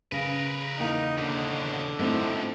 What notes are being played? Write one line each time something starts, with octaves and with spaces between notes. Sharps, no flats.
C#3 A#4 B4
E2 A#3 D#4 F5
D#2 B2 D3
G#2 F3 A3 C4 E4